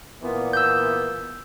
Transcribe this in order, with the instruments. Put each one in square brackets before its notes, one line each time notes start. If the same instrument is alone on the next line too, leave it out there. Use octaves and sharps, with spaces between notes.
[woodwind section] A#2 E3 B3
[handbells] E6 G6